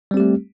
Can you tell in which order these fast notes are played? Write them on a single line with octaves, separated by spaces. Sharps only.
G3 C4 G4 A3